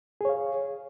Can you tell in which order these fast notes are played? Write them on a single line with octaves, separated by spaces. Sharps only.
G#4 C#5 F5